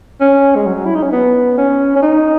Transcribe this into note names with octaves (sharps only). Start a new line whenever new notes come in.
C#4
G#3
F#3
E4
D#4
C#4
B3
C#4
C#4
D#4